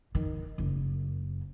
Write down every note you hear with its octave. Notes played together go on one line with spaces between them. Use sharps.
D#3
F#1